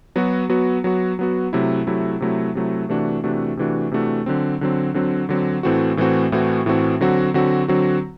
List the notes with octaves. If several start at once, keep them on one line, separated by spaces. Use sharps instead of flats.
F#3 B3 F#4
F#3 B3 F#4
F#3 B3 F#4
F#3 B3 F#4
C3 F#3 A3 E4
C3 F#3 A3 E4
C3 F#3 A3 E4
C3 F#3 A3 E4
C3 E3 A3 D4 F#4
C3 E3 A3 D4 F#4
C3 E3 A3 D4 F#4
C3 E3 A3 D4 F#4
D3 F#3 C4
D3 F#3 C4
D3 F#3 C4
D3 F#3 C4
A2 E3 A3 C4 F#4
A2 E3 A3 C4 F#4
A2 E3 A3 C4 F#4
A2 E3 A3 C4 F#4
D3 F#3 C4 F#4
D3 F#3 C4 F#4
D3 F#3 C4 F#4